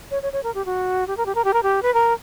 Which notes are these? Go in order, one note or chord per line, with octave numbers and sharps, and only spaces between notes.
C#5
C#5
C#5
A#4
G4
F#4
G4
A#4
G4
A#4
G4
A#4
G4
B4
A#4